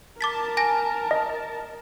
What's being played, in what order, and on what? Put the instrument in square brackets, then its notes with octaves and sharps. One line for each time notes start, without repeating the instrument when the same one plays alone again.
[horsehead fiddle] A#4 [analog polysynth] A5 [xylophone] D6 A6 B6
[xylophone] G#5 A#6
[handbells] D#5